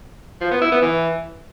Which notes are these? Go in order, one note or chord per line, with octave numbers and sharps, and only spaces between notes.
F3
B3
E4
B3
E3